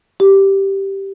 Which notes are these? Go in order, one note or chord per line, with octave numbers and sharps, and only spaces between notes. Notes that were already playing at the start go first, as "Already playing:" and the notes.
G4